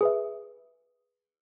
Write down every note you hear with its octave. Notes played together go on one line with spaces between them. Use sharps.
G#4 B4 E5